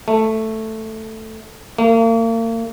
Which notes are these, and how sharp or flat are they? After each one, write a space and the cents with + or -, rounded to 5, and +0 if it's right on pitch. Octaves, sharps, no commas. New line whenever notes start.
A3 +5
A#3 -40